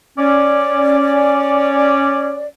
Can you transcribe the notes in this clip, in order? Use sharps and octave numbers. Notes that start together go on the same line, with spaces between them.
C#4 D5